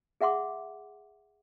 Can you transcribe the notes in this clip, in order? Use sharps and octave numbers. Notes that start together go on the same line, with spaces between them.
G#4 E5 F#5 C6 D6